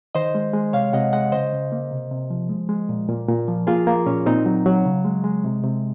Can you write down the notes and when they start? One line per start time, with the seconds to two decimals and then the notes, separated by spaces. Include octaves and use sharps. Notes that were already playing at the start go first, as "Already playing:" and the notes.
0.15 D#3 C5 D#5
0.35 G#3
0.54 G#3
0.73 C3 C#5 F5
0.93 C3 D#5 F#5
1.13 G#3 D#5 F#5
1.32 C#3 C5 D#5
1.53 C#3
1.72 A#3
1.91 C3
2.11 C3
2.30 F3
2.49 G#3
2.69 G#3
2.89 A#2
3.08 A#2
3.28 A#2
3.48 F3
3.67 A#3 F4 G#4
3.87 A#3
4.06 A#2 C#4
4.26 A#2 C4 D#4
4.46 F#3
4.66 F#3
4.85 C#3
5.05 G#3
5.24 G#3
5.44 C3
5.64 C3